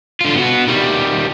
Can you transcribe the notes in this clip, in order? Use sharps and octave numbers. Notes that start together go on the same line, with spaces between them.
D3 F4
B3 F#4
D#3 G3